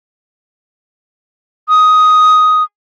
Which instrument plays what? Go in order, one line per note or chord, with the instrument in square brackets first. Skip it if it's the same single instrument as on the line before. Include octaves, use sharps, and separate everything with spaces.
[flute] D#6